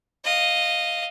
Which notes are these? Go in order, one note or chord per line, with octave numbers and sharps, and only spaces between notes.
D#5 F5